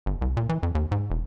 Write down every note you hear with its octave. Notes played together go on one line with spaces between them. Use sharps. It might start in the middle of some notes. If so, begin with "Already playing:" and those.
G1
C2
A#2
E3
F2
D#2
G#2
E1